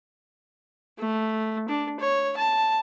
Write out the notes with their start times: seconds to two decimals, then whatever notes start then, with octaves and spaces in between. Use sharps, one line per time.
0.99 A3
1.69 D4
2.00 C#5
2.37 A5